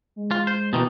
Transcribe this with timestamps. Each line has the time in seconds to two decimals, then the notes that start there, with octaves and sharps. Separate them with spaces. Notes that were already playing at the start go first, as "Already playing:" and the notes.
0.16 G#3
0.31 F4
0.47 C5
0.73 B2 D#3 E3 D#6